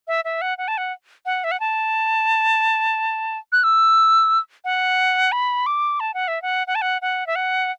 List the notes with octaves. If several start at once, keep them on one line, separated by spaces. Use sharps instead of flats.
E5
E5
F#5
F#5
A5
F#5
F#5
E5
F#5
A5
F#6
E6
F#5
B5
D6
A5
F#5
E5
F#5
F#5
A5
F#5
F#5
E5
F#5